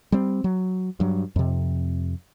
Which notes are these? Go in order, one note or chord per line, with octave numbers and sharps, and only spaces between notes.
G3 C4
F#3
G2 F#3
F2 C3